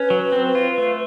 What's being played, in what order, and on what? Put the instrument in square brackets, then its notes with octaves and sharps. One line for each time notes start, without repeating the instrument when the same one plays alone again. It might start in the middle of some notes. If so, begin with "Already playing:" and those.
Already playing: [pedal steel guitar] C#4 [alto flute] B4
[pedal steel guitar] F#3
C4
F4
A3